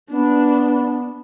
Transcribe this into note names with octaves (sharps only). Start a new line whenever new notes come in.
B3 D4